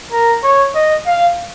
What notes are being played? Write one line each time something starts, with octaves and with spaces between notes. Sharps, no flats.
A#4
C#5
D#5
F5